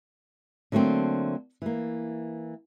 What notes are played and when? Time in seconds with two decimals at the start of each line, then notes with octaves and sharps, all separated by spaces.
0.72 D3 F#3 A3 A#3 C4
1.62 E3 A#3